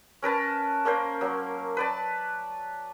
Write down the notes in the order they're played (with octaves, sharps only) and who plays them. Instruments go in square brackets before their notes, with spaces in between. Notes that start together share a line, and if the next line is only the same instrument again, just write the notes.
[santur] C#4 A#4 B4 A5
A#3 C#4 A#4 C5
F#3 A#3
B4 D5 A5